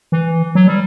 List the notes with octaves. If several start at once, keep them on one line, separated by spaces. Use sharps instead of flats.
E3
F#3
G3